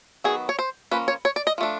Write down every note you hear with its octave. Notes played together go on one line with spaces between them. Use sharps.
D#3 F#3 B3 G#4
C#5
C5
F3 A#3 C#4 B4
C#5
C#5
D5
D#5
F3 A3 D4